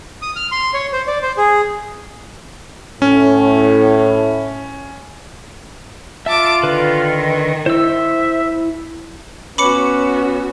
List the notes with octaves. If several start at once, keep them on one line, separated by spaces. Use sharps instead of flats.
D#6
F6
C6
C#5
C5
D5
C5
G#4
A2 C#4
F4 E5 A5 D6
D3 D#3 B4
E4 C5 E5 E6
B3 C#4 F#4 B4 C#5 B5 D6 C#7